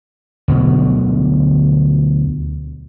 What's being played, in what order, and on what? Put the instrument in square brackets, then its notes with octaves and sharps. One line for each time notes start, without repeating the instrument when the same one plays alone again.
[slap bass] D2 B2 D3 F#3